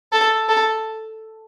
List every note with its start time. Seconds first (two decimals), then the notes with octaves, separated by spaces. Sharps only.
0.12 A4
0.49 A4